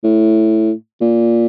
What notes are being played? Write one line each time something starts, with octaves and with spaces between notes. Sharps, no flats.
A2
A#2